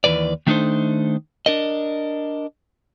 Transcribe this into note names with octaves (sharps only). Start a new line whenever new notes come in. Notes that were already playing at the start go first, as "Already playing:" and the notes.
D#2 E3 B4 D5
D#3 A3 D4 D#4 A4 C5
D4 A#4 D#5